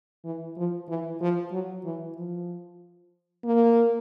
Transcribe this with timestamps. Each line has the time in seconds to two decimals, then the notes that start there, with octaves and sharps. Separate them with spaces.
0.25 E3
0.57 F3
0.89 E3
1.21 F3
1.52 F#3
1.85 E3
2.16 F3
3.45 A#3